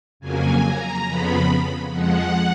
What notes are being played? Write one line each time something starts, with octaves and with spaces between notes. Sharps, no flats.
F2 C#3 F#3 A#3 G#5
A#5
F2 C#3 F3 B3 B5
F2 F3 G#3 F#5